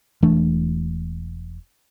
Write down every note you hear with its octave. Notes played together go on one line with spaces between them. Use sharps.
E1 E3 A3 D4